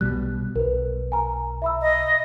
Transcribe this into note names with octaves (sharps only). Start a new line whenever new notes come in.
B1 B2 G3 F#6
B1 A#4 B4
G#5 A#5
E5 B5 E6
D#5